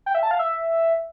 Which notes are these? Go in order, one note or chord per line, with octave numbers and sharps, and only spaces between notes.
G5
E5
A5
F5
E5